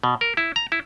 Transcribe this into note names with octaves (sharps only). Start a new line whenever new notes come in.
B2
A#4
E4
A#5
E4